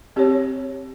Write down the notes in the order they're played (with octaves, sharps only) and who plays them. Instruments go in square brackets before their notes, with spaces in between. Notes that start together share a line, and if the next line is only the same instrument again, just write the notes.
[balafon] C4 G4 C#5